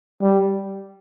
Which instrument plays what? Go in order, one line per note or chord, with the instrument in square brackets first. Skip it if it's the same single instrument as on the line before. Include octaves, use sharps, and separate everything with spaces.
[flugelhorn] G3